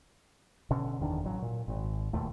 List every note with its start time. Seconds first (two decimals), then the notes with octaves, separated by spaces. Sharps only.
0.70 B2 D3 C#4
0.99 F#1 E2 D#3 D4
1.23 A1 F#3
1.42 A#2
1.68 G#1
2.13 E1 D#2 A#2 A3